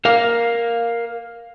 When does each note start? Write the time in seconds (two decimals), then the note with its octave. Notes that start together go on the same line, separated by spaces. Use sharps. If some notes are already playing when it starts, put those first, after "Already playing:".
0.05 A#4 F5